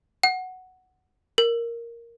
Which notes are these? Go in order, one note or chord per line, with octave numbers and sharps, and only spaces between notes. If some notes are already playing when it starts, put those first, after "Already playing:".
F#5
A#4